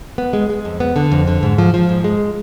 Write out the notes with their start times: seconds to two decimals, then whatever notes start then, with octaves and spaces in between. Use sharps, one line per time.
0.18 B3
0.33 G#3
0.50 G#3
0.65 F2
0.80 B3
0.96 D3
1.12 F2
1.27 D3
1.43 G#2
1.58 F3
1.74 F3
1.89 G#2
2.04 G#3